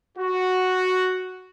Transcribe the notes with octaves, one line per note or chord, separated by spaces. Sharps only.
F#4